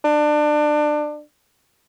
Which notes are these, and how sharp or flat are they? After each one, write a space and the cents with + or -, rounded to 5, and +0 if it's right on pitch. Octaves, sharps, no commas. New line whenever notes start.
D4 +25